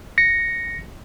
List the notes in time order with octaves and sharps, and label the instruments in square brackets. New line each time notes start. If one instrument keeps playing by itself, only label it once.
[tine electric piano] A#6 C#7